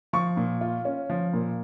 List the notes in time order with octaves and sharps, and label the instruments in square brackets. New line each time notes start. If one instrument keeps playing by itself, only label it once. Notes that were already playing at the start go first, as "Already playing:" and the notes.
[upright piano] F3 C#6
A#2
F4
C#4
F3
A#2